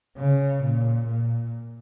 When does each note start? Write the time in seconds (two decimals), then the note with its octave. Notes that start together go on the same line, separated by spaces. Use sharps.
0.17 C#3
0.63 A#2
1.07 A#2